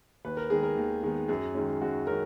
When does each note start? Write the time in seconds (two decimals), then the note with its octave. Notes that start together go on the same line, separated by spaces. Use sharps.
0.25 D#2 B4
0.37 A#4
0.50 D#3 G#3 B3 G#4
0.63 A#4
0.77 D#2
1.03 D#3 G#3 B3
1.28 F#2 G#4
1.54 D#3 G#3 C#4
1.81 F#2 F#4
2.07 D#3 G#3 C#4 A#4